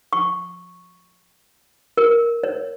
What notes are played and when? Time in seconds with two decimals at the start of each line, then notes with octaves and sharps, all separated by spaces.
0.13 C#6
1.97 A#4
2.43 C#5